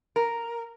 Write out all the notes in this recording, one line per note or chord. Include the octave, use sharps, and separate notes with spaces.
A#4